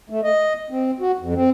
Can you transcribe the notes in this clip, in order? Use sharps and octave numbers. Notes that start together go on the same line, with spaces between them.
A3
D#5
C4
F#4
F2
C4